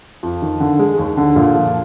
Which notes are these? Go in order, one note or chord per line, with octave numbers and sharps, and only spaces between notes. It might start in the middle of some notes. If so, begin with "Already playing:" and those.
F2
D#3
D3
G#3
D#2
D3
A#2
F3